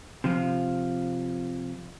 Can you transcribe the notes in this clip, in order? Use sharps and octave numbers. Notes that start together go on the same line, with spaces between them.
C3 F3 F4